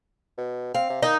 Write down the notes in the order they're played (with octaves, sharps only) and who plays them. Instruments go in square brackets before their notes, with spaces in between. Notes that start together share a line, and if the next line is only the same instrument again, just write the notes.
[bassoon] B2
[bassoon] C4 [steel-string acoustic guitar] F5
[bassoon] C3
[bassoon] D#3 [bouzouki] D#4